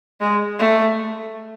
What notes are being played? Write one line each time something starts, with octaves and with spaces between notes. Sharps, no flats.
G#3
A3